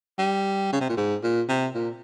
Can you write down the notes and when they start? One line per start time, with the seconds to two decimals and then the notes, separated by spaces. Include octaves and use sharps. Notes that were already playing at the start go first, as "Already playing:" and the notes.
0.18 G3
0.72 C#3
0.80 C3
0.89 A#2
0.97 G#2
1.23 A#2
1.48 C3
1.75 A#2